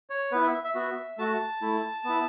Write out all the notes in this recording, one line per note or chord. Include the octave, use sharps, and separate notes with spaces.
C#5
B3 E4 B4
E5
E5
B3 F#4
A3 F#4 A5
A3 E4
B3 E4